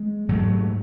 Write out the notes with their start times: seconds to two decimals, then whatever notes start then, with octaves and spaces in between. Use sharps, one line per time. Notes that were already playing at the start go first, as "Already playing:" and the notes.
Already playing: G#3
0.29 G#2 F#3 A3